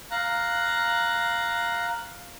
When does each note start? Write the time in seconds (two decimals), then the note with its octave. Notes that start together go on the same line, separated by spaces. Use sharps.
0.11 F5 A#5 F#6